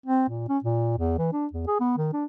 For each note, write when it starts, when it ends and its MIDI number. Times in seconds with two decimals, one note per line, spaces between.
0.06 0.26 60
0.29 0.45 46
0.48 0.58 61
0.64 0.95 46
0.98 1.14 40
1.18 1.30 52
1.32 1.46 62
1.53 1.65 40
1.67 1.77 68
1.80 1.96 59
1.97 2.08 51
2.13 2.25 62